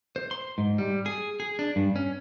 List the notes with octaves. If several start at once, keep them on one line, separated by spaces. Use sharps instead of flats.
C5
C6
G#2
G3
G#4
G#4
D4
G2
C#4